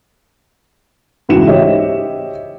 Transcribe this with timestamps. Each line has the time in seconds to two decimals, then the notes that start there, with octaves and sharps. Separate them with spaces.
1.29 C#2 G#2 E3 F#4 C#7 E7
1.47 G4 C5 C#5 D#5 E5